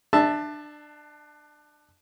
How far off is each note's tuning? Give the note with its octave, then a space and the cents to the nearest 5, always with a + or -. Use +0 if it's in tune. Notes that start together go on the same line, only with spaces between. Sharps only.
D4 +25 E5 +0 A5 +0